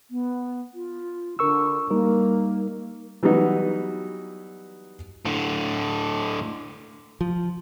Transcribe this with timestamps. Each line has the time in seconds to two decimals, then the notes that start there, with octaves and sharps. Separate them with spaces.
0.10 B3
0.74 F4
1.39 D3 A#4 C#6 E6
1.90 G3 A#3 D#4 A#4
3.23 E3 F#3 G3 B3 D#4 F#4
5.25 A2 D3
7.21 F3